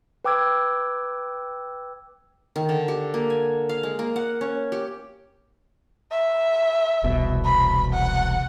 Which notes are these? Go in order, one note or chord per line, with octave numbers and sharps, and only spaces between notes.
B4 G5 D6 E6 G#6
D#3
D3
G4
A#3
G#5
F5
G#3
A#3
F#5
C#4
G4
E5
E1 C2 B2
B5
F#5